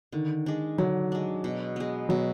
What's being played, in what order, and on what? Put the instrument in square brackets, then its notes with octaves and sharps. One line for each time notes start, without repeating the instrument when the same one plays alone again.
[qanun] D3 [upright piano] D#3
[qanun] G#3 D4
[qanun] D3 [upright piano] F#3
[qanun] G#3 D4
B2
G#3 B3
[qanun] B2 [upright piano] F#3